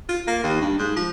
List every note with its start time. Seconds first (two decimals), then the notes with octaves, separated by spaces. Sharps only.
0.09 F4
0.27 A#3
0.43 D#2
0.61 G2
0.78 G#2
0.96 F3